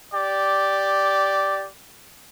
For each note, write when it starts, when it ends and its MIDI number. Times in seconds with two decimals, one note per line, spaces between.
0.14 1.66 67
0.14 1.66 74